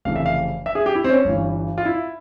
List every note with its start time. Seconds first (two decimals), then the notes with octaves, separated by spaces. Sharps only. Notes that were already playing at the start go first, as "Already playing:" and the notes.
0.05 F1 F2 C#3 E3 F5
0.16 E5
0.26 F5
0.66 E5
0.75 G#4
0.86 G4
0.95 E4
1.04 C4
1.10 C#4
1.25 G1 G2 E3
1.78 F4
1.85 E4